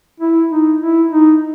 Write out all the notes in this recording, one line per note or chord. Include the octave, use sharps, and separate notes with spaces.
E4
D#4
E4
D#4